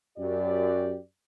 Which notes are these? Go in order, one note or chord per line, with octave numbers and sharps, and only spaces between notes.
F#2 G4 D5